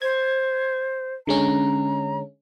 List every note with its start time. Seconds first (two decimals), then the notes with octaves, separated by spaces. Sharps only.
0.02 C5 G#6
1.27 D3 G#3 C#4 A#5